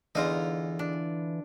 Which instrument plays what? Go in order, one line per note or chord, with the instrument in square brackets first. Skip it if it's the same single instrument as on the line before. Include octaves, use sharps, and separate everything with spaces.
[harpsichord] E2 D#4 [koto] D3 F4 A#5 [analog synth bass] E3
[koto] D4